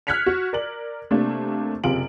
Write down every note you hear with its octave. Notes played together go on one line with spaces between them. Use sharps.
F6 F#6 G#6 B6 C#7 F7
F#4
A#4 D5 F#7
C3 A3 A#3 D4
F#1 C3 F4 D7 F#7